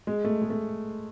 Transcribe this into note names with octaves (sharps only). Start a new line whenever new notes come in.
G#3
A3
G#3
A3